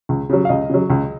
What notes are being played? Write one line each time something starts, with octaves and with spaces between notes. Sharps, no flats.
C#2
C#3 F#3
F5
C#2 D#5
C#3 F#3
C#2